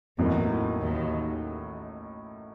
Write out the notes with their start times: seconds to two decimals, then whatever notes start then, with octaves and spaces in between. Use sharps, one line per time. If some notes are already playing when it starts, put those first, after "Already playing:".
0.18 A1 E2 A2 E3 F#3 A#3 D#4
0.81 D#2 D#3